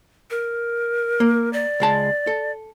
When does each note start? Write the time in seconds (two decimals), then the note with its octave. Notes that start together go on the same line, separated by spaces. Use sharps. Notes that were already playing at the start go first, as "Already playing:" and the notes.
0.30 A#4
1.20 A#3
1.53 D5
1.80 C#2 G#3 A5
2.27 A4